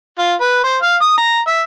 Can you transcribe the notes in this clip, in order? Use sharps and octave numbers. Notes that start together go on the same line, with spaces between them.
F4
B4
C5
F5
D#6
A#5
E5